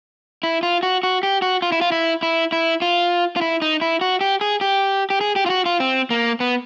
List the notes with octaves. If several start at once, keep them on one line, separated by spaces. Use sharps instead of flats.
E4
F4
F#4
F#4
G4
F#4
F4
E4
F4
E4
E4
E4
F4
F4
E4
D#4
E4
F#4
G4
G#4
G4
G4
G#4
G4
F4
F#4
F4
C4
A#3
B3